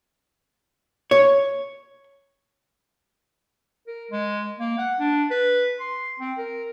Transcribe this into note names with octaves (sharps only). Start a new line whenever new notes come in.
C#5
A#4
G#3
A#3
F#5
D4
B4
C6
C4
A#4